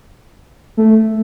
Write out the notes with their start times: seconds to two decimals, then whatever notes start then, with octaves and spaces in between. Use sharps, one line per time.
0.77 A3